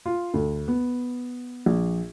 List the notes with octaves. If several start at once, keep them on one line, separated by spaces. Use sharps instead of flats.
F4
D2
B3
A#1